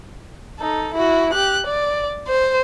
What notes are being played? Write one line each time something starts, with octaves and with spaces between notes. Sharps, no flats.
D#4 A4
E4 F#4
G4 F#6
D5
C5